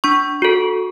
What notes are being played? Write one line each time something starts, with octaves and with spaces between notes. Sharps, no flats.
D4 C#6
F#4 A4